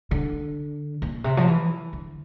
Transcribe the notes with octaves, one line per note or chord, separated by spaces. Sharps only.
D3
A#2
C3
F3
E3
D3